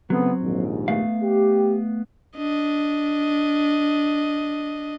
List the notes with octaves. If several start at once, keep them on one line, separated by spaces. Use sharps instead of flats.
C#3 F#3 A3 B3 C4
A#1 D#2 G#2
A3 B3 F5
G4
D4 D#5